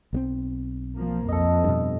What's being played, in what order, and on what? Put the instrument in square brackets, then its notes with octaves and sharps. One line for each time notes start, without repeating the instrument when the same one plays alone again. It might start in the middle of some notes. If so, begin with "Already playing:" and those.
[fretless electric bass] B1 G3 C4
[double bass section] F3 A#3
[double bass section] F2 [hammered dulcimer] A4 D#5
[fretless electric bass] G2 B2